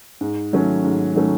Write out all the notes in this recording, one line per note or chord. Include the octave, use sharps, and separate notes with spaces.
G#2
D#3 F#3 A3 C#4
G#2
D#3 F#3 A3 C#4